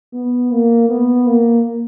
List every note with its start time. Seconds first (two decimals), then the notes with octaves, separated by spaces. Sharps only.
0.14 B3
0.51 A#3
0.89 B3
1.26 A#3